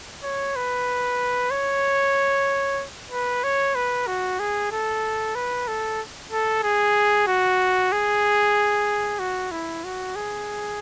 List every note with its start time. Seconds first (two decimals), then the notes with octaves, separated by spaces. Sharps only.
0.23 C#5
0.56 B4
1.51 C#5
3.11 B4
3.44 C#5
3.75 B4
4.07 F#4
4.39 G#4
4.71 A4
5.35 B4
5.68 A4
6.32 A4
6.63 G#4
7.27 F#4
7.92 G#4
9.19 F#4
9.51 E4
9.84 F#4
10.16 G#4